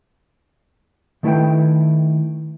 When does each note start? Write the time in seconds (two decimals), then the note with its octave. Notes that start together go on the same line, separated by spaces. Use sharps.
1.23 D#3 A3 E4 B4 E5 G5